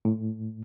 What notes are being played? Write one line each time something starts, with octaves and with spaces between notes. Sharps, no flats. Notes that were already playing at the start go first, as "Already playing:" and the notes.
A2